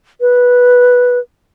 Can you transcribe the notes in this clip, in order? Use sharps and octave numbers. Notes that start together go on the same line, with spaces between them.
B4